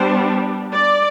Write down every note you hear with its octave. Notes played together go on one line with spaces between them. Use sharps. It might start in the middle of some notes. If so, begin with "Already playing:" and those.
Already playing: G3 B3 D4 C5
D5